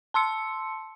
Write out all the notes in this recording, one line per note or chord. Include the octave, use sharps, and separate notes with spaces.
A5 C6 E6 C#7